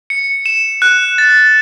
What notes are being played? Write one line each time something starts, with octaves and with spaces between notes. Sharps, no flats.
C#7
E7
F#6
A6